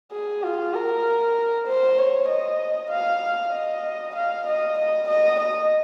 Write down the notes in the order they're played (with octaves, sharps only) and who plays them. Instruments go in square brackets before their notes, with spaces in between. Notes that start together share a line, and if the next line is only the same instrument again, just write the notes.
[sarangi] G#4
F4
A#4
C5
C#5
D#5
F5
D#5
F5
D#5
D#5
D#5
D#5